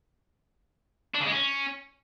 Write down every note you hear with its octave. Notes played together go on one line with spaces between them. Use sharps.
D4
C#3
G#3
C#4